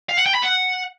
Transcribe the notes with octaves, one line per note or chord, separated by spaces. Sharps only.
F5
F#5
G5
B5
F#5